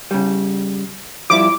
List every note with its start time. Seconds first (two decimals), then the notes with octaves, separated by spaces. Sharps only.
0.11 C#3 G3
1.30 F3 G3 E4 D6